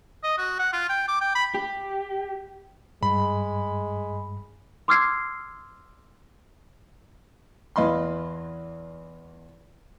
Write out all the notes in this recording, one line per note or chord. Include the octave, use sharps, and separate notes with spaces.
D#5
F#4
F#5
F4
G5
D6
G5
B5
G4
G2 G#3 B5
C6 D6 E6 F6 G#6 C7
E2 E3 D#5 F5 B5 C6